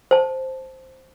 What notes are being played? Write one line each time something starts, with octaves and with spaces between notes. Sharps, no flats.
C5 A5